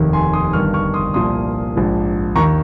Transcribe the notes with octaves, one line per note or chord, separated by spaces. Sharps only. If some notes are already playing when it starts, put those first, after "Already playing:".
Already playing: F1 D#2 D#3
G#5 C6
C6 D#6
G1 G2 D#3 C#6 F6
C#6 F6
C6 D#6
C2 A#2 F3 C6 D#6
A#1 G#2 F3
D#2 D#3 A#5 C#6